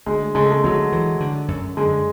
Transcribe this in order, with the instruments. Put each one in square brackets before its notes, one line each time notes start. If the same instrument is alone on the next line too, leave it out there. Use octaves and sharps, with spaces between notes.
[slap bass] D2 [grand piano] G#3
[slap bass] C#3 [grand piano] G#3
[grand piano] A3
G#3
[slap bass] D2 [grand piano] F#3
[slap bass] E3
D3
F#2
[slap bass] D3 [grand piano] G#3